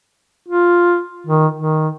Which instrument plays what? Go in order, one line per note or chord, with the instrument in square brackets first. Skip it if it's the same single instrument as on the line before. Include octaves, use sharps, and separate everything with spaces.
[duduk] F4
D#3
D#3